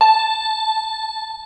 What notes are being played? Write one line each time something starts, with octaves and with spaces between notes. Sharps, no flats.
A5